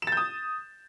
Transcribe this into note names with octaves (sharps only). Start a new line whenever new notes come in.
D#6 G6 A6 E7